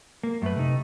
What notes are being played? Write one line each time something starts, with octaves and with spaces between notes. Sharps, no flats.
A#3
F#2 A3 B4
C3 D#4